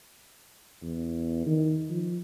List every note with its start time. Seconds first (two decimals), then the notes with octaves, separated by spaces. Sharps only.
0.83 E2
1.46 D#3
1.90 F3